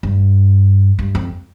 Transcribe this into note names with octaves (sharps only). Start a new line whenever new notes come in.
G2
G2
F2